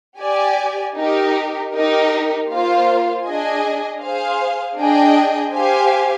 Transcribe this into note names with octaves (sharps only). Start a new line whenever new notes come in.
G4 D5 G#5
D#4 G4 A#4
D#4 G4 A#4
A#3 F4 C5 F5
D4 G#4 D#5 G#5
G#4 C5 F5
D4 G#4 D#5 G5
G4 C5 F5 G#5